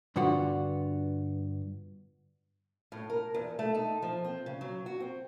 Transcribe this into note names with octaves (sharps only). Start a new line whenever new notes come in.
G2 D3 B3 F4 F#4
A2
A#4
E2
A3
D#4
F3
C4
C#3
F#3
F#4
C4